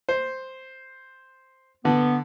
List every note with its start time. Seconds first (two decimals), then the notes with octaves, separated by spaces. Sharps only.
0.09 C5
1.85 D3 B3